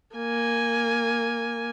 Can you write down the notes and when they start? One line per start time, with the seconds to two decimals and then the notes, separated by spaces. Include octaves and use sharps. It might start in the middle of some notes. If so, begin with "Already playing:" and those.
0.16 A#3 G#5